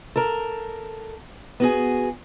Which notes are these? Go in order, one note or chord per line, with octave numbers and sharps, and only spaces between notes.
A4 A#4
B3 F#4 G#4